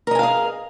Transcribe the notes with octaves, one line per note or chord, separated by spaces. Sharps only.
G#4 A#4 D#5 F5 G#5